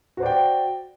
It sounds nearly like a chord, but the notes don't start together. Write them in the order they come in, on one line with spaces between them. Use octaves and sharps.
F#4 C5 D5 G5